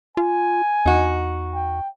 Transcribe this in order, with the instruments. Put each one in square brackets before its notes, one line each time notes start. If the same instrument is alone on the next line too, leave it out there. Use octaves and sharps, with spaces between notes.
[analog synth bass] F4 [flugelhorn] G#5
[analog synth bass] E2 [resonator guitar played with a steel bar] D#4 F#4
[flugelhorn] G5